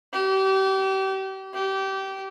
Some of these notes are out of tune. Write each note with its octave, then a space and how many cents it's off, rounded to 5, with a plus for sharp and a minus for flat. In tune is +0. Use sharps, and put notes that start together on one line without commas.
G4 -35
G4 -25